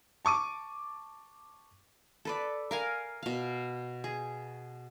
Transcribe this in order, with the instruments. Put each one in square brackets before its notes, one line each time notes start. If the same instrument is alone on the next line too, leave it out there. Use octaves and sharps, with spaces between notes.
[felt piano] A5 C#6 D6 D#7
[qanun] A4 B4 D5
A#4 F5 G#5
B2 F5
G#4